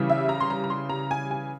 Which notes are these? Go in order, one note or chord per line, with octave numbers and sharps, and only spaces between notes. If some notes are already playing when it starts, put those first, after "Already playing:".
Already playing: C#3 E3 G3
E5
A#5
C6
A#5
A#5
C6
A#5
G#5
G#5